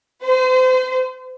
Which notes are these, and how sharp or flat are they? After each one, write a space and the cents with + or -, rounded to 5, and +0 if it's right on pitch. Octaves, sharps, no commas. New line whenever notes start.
C5 -35